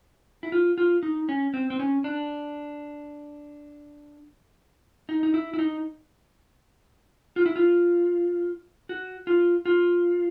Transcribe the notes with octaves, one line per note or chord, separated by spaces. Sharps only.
E4
F4
F4
D#4
C#4
C4
C4
C#4
D4
D#4
D#4
E4
E4
D#4
F4
E4
F4
F#4
F4
F4